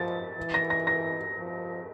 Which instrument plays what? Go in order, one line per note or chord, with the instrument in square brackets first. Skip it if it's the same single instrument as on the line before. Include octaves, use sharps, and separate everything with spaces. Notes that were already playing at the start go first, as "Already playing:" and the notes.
Already playing: [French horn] F3 [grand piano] A6
[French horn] E3
[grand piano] A#6
A#6
A#6
[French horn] F3